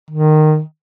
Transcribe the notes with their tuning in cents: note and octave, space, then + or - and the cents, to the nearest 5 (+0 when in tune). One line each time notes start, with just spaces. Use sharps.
D#3 -15